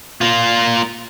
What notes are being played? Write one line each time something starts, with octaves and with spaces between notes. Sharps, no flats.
A#3 F4